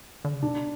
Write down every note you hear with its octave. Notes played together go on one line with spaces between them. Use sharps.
D3
C#3
B2 D4